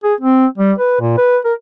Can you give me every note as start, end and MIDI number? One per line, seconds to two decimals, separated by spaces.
0.04 0.14 68
0.21 0.46 60
0.58 0.73 55
0.78 0.98 71
1.00 1.14 46
1.17 1.38 71
1.45 1.53 70